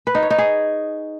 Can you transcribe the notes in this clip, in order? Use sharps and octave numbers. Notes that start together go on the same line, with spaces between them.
B4
D#4
C#5
D#4
G#4